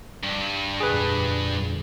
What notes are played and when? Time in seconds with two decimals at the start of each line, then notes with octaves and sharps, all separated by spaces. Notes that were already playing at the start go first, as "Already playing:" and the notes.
0.24 G2
0.80 F2 A#2 D3 G#4 B4